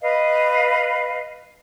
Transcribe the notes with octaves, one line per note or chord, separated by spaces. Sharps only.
B4 D#5 F5